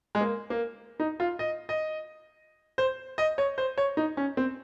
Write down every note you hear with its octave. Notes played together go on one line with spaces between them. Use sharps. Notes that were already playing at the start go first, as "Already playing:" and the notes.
G#3
A#3
A#3
D#4
F4
D#5
D#5
C5
D#5
C#5
C5
C#5
D#4
C#4
C4